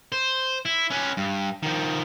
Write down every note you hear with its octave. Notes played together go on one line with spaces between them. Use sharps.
C5
E4
C#4 B4
G2
D#3 F3